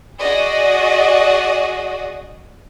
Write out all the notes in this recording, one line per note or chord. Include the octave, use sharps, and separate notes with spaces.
F#4 G#4 D5 D#5